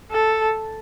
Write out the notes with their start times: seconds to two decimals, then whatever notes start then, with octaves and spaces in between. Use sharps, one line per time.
0.11 A4